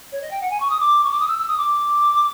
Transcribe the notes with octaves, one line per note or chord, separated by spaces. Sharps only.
C#5
D#5
G5
F#5
G#5
C#6
D#6
D6
C#6
D6
D#6
E6
E6
D#6
D6